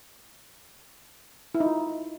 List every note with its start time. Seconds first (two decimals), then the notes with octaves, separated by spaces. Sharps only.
1.55 E4
1.60 D#4
1.66 F4